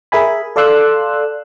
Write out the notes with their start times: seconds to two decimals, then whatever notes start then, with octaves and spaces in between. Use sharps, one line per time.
0.12 G#4 A#4 E5 G#5 B5
0.56 A4 D5 F5 C6 E6 F#6